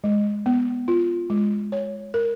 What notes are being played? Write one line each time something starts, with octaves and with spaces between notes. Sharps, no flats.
G#3
B3
F4
G#3
C#5
A#4